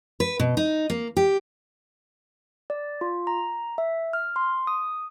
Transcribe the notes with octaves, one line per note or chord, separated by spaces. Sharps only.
B4
B2
D#4
A#3
G4
D5
F4
A#5
E5
F6
C6
D#6